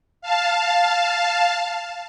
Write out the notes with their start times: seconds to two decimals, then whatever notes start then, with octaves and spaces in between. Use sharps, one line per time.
0.22 F5 A5